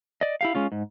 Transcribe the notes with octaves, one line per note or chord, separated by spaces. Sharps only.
D5 D#5
E4 G4 F5
G#3 C#4 F4
G#2